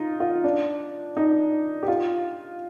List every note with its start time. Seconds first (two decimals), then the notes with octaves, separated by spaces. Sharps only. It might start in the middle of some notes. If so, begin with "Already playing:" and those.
Already playing: D#4 F4
0.20 F4
0.44 D4
1.17 D#4
1.83 G4
1.88 F4